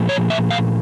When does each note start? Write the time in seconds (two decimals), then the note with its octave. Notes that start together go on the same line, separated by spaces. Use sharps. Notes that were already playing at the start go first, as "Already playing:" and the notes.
Already playing: A#2 F3 A3
0.09 C#5
0.30 E5
0.50 F5